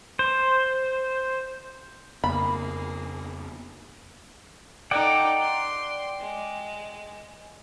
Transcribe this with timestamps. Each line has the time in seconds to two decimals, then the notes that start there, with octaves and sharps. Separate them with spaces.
0.19 C5
2.24 F2 C#3 A#3 B3 G#4 B5
4.91 D#4 A4 D5 F#5 G5
5.41 C6
6.20 G#3